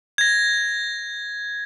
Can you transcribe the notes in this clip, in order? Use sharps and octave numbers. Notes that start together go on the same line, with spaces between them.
G#6 A#6